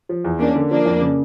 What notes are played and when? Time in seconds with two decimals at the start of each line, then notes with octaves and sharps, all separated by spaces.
0.09 F3
0.24 E2
0.39 A#3 C#4 D4
0.56 D3
0.70 F3 A#3 D4
0.86 F2
1.01 C#3